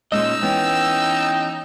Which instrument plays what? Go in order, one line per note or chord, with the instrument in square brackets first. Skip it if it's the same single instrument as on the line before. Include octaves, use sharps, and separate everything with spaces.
[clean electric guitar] A#2 C#4 D#5 [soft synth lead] G#3 [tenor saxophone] D#4 [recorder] E6
[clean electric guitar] E3 B3 C#4 [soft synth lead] G5